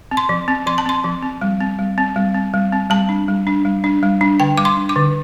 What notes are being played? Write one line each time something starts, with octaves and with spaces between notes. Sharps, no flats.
C4
C6
F3
C4
F3 C6
A5
C4 C6
F3
C4
G3
C4
G3
C4
G3
C4
G3
C4
G3 A5
D4
G3
D4
G3
D4
G3
D4
D3 G5
G3 D6
C6
D4
D6
D3